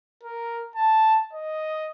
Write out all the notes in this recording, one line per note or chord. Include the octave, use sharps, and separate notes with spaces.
A#4
A5
D#5